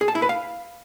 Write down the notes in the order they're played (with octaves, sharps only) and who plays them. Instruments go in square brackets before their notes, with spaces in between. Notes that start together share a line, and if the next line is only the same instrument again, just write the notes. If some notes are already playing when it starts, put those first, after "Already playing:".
[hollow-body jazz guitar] G#4
A5
E4
B4
F5